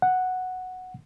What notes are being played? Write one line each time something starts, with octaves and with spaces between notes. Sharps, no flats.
F#5